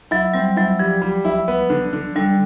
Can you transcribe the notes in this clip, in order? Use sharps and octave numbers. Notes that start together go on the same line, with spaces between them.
F#3 E4
G3 C4
F#3 E4
F3 G3
G3
E4
B3
D3
D3
D3 G3